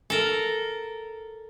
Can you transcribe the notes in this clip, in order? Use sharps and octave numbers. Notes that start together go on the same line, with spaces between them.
A4 A#4